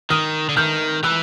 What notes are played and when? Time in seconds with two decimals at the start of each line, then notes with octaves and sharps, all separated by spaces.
0.10 D#3 D#6 F6
0.49 D3
0.57 D#3 F6 G6
1.03 E3 E6 F#6